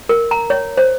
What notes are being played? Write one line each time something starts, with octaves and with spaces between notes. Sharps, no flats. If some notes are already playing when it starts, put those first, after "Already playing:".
A#4
A#5
C#5
C5